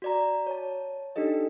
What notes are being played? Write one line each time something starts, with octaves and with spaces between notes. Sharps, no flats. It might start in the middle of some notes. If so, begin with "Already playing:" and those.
F#4 D5 A#5
C#5 A5
D4 D#4 G4 A4 D#5